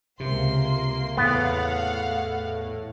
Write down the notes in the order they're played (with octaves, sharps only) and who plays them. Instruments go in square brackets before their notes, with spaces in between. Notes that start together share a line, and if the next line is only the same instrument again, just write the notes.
[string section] C#2 A#3 C6 [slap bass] C3
[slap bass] E2 [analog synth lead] A2 [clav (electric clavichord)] B3 [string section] F5 F#5